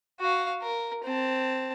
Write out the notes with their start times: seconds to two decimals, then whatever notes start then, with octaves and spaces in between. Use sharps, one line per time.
0.20 F#4 F5
0.62 A#4
1.04 C4 A5